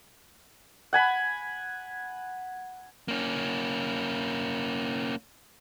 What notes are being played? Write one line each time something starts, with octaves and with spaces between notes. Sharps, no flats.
F#5 G#5 B5
A#3 C#4